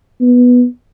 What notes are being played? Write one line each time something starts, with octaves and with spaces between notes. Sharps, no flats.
B3